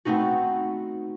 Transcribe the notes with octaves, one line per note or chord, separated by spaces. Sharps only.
A3 B3 C4 D#4 F#4